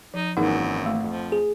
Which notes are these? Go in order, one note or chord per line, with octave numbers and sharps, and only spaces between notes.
F3 D#4
G#1 F#2 E3 A#3 D#4 G#4 A#4 F#5
A3
F2 F3
G#4